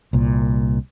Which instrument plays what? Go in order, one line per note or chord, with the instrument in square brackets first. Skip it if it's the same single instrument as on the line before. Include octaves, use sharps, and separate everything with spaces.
[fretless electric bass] C2 A#2